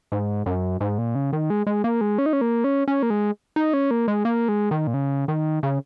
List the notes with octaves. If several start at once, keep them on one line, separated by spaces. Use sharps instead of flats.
G#2
F#2
G#2
A#2
C#3
D#3
G#3
G#3
A#3
G#3
C#4
D#4
C#4
A#3
C#4
C#4
A#3
G#3
D#4
C#4
A#3
G#3
A#3
G#3
D#3
A#2
C#3
D#3
C#3